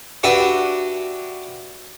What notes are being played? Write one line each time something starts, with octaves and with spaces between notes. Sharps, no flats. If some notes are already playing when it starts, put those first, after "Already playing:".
D4 F#4 G4 B4 D5 E5